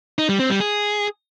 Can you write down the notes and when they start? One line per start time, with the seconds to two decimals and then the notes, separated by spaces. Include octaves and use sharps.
0.18 D#4
0.29 G3
0.39 C4
0.50 G3
0.60 G#4